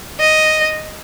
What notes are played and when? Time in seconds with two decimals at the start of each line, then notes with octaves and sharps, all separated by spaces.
0.20 D#5